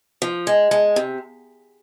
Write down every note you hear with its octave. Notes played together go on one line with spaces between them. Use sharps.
F3
G#3
G#3
C3